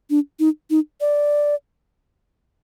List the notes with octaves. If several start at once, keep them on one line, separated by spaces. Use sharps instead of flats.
D4
D#4
D#4
D5